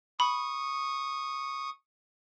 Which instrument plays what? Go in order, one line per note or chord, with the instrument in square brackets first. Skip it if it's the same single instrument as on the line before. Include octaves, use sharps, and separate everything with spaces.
[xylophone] B5 [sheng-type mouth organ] C#6 D#6